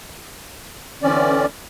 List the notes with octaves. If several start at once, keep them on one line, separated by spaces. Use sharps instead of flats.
D3 E3 C4 C#4 D5